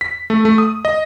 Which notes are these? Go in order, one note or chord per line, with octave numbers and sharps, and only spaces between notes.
B6
A3
A3
D#6
D#5